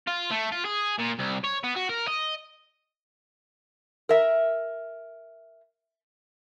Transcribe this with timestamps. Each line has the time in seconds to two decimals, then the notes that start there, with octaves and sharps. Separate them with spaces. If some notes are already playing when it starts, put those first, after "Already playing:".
0.08 F4
0.31 A3
0.52 F4
0.65 G#4
0.99 A#2
1.19 C2
1.44 C#5
1.64 B3
1.76 F#4
1.89 A#4
2.08 D#5
4.09 A#4 E5